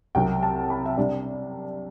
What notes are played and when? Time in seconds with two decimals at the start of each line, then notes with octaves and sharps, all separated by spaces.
0.15 C2 C3 F#3 G5
0.43 A5
0.70 B5
0.86 E5
0.97 C3 G3 D4 D5